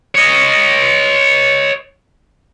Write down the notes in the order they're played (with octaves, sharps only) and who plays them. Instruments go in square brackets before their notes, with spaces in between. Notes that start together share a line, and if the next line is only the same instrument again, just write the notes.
[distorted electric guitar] C#5 D#5